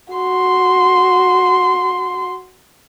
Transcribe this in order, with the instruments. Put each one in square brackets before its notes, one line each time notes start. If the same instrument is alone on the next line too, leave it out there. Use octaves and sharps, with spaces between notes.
[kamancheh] F#4 C6